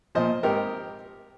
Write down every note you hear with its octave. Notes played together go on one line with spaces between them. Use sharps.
A#2 F3 C5 D#5
G#1 G4 A#4